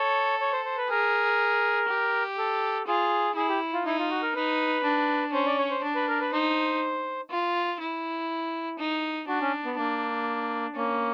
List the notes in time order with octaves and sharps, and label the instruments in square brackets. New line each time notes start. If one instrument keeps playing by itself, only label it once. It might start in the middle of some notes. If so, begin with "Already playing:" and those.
Already playing: [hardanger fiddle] A4 [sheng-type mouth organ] C#5
[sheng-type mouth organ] C#5
C5
C5
B4
[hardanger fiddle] G#4 [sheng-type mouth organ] A#4
[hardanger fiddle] G4
[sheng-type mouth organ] A4
[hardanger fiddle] F4 [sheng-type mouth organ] G#4
[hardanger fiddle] E4 [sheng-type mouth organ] G#4
[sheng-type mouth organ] G4
F4
[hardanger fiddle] D#4 [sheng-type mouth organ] E4
[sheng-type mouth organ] F4
F#4
A#4
[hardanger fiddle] D#4 [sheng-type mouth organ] B4
[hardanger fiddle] D4
[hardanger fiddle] C#4 [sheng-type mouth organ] C5
[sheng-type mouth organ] D5
C#5
C5
[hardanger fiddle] D4
[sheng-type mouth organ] B4
A#4
B4
[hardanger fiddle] D#4 [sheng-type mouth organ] C5
[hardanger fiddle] F4
E4
D#4
[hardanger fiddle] D4 [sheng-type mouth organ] F#4
[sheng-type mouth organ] C#4
B3
[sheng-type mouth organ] A#3 [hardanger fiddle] D4
[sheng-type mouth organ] A#3 [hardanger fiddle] C#4